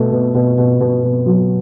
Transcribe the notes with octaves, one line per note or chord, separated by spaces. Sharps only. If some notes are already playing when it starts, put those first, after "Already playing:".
Already playing: B2 A3
B2
B2
B2
B2
B2
F#3